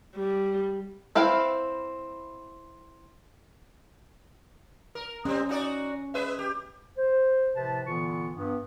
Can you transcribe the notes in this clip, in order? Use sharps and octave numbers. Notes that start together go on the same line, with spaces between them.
G3
C4 E4 B4 F5 G5
A#4
G3 C4 C#4
D#4 F#4 D5
G#3 B4 E5
G4
C5
A2 C3 F3 B4 C5 A5
A#2 D3 E3 B3 F4 C#6
G2 B3